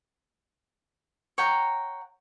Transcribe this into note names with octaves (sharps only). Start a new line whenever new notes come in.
C#5 F#5 G5 A#5